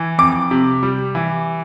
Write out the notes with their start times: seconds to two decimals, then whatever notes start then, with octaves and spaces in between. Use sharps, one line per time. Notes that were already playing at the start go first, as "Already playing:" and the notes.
Already playing: E3
0.18 F2 D6
0.51 C3
0.83 G3
1.15 E3